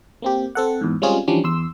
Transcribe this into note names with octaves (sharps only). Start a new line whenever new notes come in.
A#3 C4 G4
C4 A4 F#5
E2 G#2
G3 G#3 C4 C#4 F4 G#4
E3 F3 G3 C#4 D4
E2 C6 E6